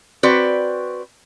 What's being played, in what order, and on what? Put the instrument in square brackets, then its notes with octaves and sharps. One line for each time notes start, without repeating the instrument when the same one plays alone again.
[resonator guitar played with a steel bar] C4 F#4 B4 D5